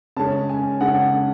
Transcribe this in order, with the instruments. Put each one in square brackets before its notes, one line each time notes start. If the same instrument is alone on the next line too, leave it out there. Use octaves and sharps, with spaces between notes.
[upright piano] C#3 G#3 C#4 A5
G#5
C#3 G#3 C#4 F#5